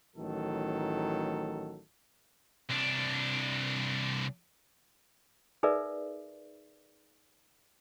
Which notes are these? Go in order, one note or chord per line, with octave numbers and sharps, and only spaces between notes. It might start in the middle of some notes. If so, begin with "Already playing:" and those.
A1 A2 D#3 F#3 A4
C2 D4
D#4 G#4 A#4 B4 D5 E5